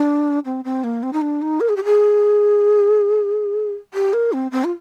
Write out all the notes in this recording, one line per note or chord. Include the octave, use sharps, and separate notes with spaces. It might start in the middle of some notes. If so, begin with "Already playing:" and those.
Already playing: D4
C4
C4
A#3
C4
D#4
D4
D#4
A#4
G#4
G4
G#4
G4
A#4
C4
C4
F4